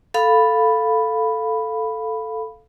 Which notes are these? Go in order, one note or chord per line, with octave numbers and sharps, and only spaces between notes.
A4 F5 B5